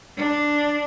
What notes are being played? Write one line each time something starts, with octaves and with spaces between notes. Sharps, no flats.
D4